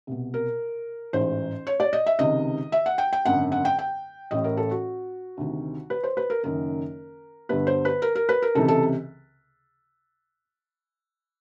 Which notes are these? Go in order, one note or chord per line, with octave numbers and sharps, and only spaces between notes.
C2 B2
A#4
A1 G#2 E3 C5
C#5
D5
D#5
E5
C#2 C3 D#3 D#5
E5
F#5
G5
G5
G#1 F#2 D3 F#5
F#5
G5
G5
A1 A2 E3 D#5
A#4
A4
F#4
D2 C3 D#3
B4
C5
B4
A#4
F#1 F#2 D#3 A#4
G1 G2 D3 B4
C5
B4
A#4
A#4
B4
A#4
C#2 C3 E3 A4
A4